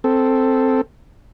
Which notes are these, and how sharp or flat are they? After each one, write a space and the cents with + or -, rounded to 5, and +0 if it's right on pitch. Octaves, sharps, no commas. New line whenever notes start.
C4 +0 A4 +0